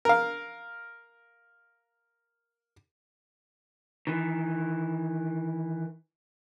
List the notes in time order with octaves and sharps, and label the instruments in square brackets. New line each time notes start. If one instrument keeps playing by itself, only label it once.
[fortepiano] A#4 F5
[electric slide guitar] D#3 E3